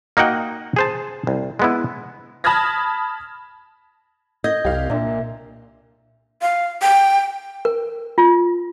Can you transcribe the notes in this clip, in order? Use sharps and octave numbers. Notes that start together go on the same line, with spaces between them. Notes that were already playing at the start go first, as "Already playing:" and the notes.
A#3 D#4 F#4 F#5 G5
G#4 C5 A5
C2
G#3 B3 E4
A5 B5 D#6 F6 G#6 A#6
D#5 G6 G#6
C2 G4 F5
A#2 D4 A#4 E5
F5
G5
A#4
F4